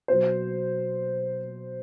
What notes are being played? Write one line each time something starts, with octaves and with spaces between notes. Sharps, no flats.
B2 F#3 C5